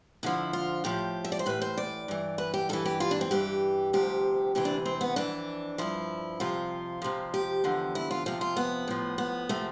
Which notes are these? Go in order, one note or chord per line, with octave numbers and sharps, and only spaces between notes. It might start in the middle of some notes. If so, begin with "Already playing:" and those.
F2 D3 F3 E4
F4
A2 F3 G4
E5
D5
C5
A2 E3 B4
C5
D5
G2 E3
B4
G4
G2 E3 A4
G4
F4
D4
C4
G2 E3 G4
D2 C3 F3 G4
D2 C3 E3 G4
D4
C4
B3
F2 E3 D4
G2 F3 E4
F2 C3 F3 F4
F2 C3 F3
G4
E2 D3 F3
E4
F4
F2 C3 F3 F4
F4
B3
A2 F3
B3
C3 F3 A3